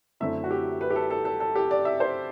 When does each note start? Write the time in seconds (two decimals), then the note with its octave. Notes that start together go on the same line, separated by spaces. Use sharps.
0.20 F#2 D3 A3 C4 E4 E5
0.44 F#4
0.51 G4
0.81 B4
0.90 G4
0.96 A4
1.10 A4
1.25 A4
1.40 A4
1.56 G4
1.71 D5
1.85 E5
2.00 C5